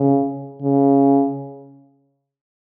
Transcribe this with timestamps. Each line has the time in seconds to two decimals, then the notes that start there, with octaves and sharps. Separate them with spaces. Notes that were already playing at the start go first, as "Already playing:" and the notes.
Already playing: C#3
0.62 C#3